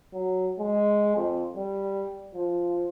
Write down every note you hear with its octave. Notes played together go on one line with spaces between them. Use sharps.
F#3
G#3
F2
G3
F3